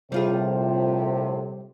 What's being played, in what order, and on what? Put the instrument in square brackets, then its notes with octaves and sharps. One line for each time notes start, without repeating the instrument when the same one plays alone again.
[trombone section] A#1 A2 C5 [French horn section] C3 [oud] G3 F4 G#4